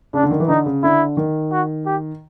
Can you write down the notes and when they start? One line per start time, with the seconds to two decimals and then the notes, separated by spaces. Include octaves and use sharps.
0.14 C#3 D4
0.23 D3
0.31 D#3
0.40 E3
0.48 D3 D#4
0.66 C#3
0.83 D3 E4
1.17 D#3
1.52 F#4
1.86 G4